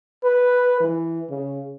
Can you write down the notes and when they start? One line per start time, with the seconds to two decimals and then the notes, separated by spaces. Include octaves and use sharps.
0.24 B4
0.81 E3
1.30 C#3